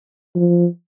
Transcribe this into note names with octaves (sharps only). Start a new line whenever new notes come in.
F3